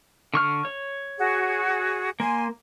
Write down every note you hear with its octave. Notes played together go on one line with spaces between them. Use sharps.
D3 C#6 F6
C#5
F#4 G#4
A#3 G#5 C6